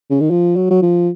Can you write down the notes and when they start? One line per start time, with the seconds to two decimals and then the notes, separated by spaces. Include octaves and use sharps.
0.10 C#3
0.20 D#3
0.30 F3
0.56 F#3
0.70 F#3
0.82 F3